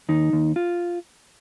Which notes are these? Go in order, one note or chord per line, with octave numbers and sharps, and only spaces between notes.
D#2 D#4
D#2
F4